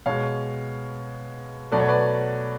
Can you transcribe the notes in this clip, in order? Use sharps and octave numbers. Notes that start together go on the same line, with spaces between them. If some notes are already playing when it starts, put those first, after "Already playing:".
B2 G#3 C#5 F5
B2 F#3 A3 D5
C#5
B4 D5